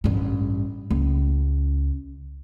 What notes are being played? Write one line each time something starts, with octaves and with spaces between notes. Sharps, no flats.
A1 G2
C#2